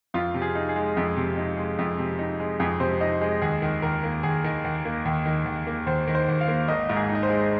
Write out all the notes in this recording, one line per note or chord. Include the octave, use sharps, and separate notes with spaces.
F2 F4
C3
G#4
D#4
G#4
G#3
F2
C3
D#4
G#3
F2
C3
D#4
G#3
F2 G#4
C3 C5
D#4 D#5
G#3
D#2 G#4
D#3
D#2 A#4
A#3
D#2 G#4
D#3
D#2
A#3
D#2
D#3
D#2
A#3
D#2 C5
D#3
C5
D#2
F5
A#3
G#1 D#5
G#2
G#4
D#4
D#5
C5
G#3